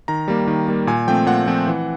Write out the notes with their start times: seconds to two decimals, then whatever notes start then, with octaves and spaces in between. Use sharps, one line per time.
0.08 D#3 A#5
0.28 G3 A#3
0.47 D#3
0.68 G3 A#3
0.87 A#2 G#5
1.07 F3 A3 C4 G5
1.26 A#2 F#5
1.47 F3 A3 C4
1.67 E3